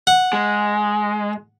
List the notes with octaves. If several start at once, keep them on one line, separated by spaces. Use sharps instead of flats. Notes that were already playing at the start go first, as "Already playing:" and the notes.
F#5
G#3